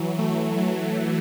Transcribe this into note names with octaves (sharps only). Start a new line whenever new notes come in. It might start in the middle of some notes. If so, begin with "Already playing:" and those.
Already playing: E3 F#3
A3
F#3